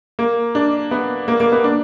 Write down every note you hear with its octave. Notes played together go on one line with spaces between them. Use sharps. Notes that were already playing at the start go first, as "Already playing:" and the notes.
A#3
D4
B3
A#3
A#3
B3
D4